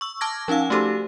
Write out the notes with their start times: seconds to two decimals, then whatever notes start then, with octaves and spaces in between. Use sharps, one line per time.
0.01 C#6 E6
0.21 A5 D6 F6 G#6 A#6
0.48 F3 C#4 D#4 F5 E6
0.70 A3 D#4 F#4 G4 A4 C5